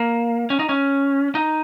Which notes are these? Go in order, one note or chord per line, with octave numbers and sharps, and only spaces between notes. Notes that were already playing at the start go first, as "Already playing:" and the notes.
Already playing: A#3
C#4
D#4
C#4
D#4